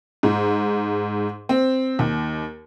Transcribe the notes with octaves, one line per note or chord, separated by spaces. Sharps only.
G#2
C4
D#2